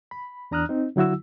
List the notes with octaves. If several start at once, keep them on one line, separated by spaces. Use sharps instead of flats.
B5
E2 D4 A#5 D#6 F6 F#6
C4 D#4
D3 F#3 E4 F#4 E6